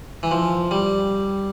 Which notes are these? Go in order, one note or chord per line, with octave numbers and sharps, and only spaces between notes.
E3
F3
G3